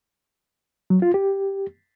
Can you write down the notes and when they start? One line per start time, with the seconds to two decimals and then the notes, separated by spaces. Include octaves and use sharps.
0.90 F#3
1.02 F4
1.14 G4